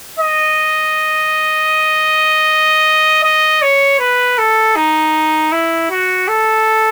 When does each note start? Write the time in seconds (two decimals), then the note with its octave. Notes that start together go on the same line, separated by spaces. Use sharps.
0.19 D#5
3.23 D#5
3.62 C#5
4.00 B4
4.38 A4
4.76 D#4
5.52 E4
5.90 F#4
6.28 A4